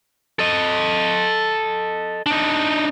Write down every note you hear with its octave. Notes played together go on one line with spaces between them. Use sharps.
A4 D#5
D4 D#4